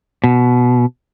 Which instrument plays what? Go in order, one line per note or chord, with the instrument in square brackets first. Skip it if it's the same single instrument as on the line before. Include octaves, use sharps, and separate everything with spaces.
[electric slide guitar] B2